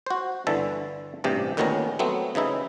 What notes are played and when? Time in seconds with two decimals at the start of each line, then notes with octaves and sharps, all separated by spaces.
0.06 F#4 C5
0.47 G1 D3 E3 E5 A5
1.24 A1 G2 C3 G4
1.57 D2 A#2 D#3 B3 C#4 A#5
1.99 F#3 A3 B3 C4
2.35 C#3 E3 D#4 E4